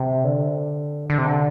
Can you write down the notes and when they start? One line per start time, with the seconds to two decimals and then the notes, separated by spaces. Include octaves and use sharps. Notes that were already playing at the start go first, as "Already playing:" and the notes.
Already playing: C3
0.24 D3
1.10 D3
1.18 C3
1.27 D3